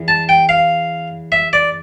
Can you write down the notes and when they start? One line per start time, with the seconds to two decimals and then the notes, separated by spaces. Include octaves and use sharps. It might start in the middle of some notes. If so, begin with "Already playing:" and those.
Already playing: E2
0.08 A5
0.29 G5
0.49 F5
1.32 E5
1.53 D5